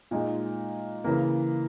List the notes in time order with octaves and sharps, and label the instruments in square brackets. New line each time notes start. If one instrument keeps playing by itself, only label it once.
[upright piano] A#2 G#3 D#4
C#3 E3 A#3